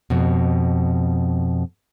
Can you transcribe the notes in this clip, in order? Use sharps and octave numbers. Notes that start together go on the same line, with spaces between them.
F2 B2